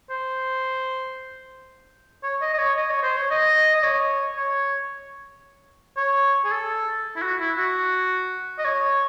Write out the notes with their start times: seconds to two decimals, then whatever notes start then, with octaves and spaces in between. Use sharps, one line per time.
0.10 C5
2.23 C#5
2.42 D#5
2.54 D#5
2.58 C#5
2.77 D#5
2.90 C#5
3.03 C5
3.17 C#5
3.31 D#5
3.74 D#5
3.84 C#5
4.37 C#5
5.97 C#5
6.44 G#4
6.51 A4
7.16 E4
7.22 F#4
7.40 E4
7.58 F#4
8.59 D#5
8.65 C#5